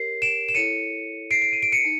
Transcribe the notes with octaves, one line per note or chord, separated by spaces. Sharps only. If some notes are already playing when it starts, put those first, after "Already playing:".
Already playing: G4 A#4 C#5 C7
D7 E7
E7
E4 A4 C#5 C#7 D#7
C7 D7
C7 D7
D#7
D7
C#7 D#7
D#4